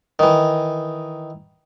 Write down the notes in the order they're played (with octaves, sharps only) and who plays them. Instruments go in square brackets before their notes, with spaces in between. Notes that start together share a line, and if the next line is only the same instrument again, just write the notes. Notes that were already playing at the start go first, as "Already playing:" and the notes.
[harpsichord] D#3 E3